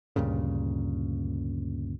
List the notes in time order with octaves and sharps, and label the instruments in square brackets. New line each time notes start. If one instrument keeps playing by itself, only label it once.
[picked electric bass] D2 G2 A#2 C#3